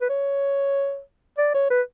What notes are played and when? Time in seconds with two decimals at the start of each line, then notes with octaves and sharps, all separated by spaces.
0.01 B4
0.09 C#5
1.38 D5
1.54 C#5
1.70 B4